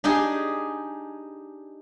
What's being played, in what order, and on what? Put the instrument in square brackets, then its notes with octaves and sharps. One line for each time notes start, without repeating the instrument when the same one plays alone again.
[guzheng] D4 D#4 G4 G#4